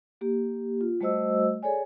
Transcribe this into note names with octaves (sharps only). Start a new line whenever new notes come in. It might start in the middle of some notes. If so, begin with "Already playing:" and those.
A#3 G4
F4
G3 A3 F#4 C5 D#5 E6
G#4 A4 C#5 D5 G#5